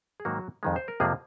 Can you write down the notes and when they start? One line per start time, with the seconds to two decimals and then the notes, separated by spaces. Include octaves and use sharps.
0.20 G#4
0.25 G#2 D#3 F#3 A#3 F#4
0.63 F2 D#3 G#3
0.76 C5
0.88 A#4
1.00 F2 C3 F3 G#3 A#3 G#4